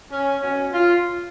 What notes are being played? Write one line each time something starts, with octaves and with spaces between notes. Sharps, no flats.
C#4
B2 F#3 C#4
F4